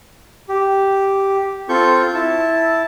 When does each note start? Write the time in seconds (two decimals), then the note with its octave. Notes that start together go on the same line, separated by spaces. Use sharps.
0.49 G4
1.69 C4 F4 A4 C#6 G6
2.15 E4 A5